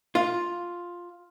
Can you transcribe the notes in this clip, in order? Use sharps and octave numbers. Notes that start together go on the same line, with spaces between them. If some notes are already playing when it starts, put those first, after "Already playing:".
F4